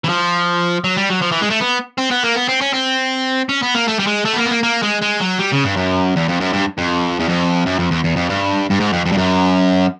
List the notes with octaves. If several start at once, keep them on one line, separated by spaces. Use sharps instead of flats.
E3
F3
F#3
G3
F#3
F3
E3
G#3
A3
B3
C4
B3
A#3
B3
C4
C#4
C4
C#4
B3
A#3
A3
G3
G#3
A3
B3
A#3
B3
A#3
A#3
G#3
G#3
F#3
G3
C#3
G2
F#2
E2
F2
F#2
G2
F2
E2
F2
F#2
F2
E2
E2
F2
G2
G2
G#2
F2
F2
G2
F#2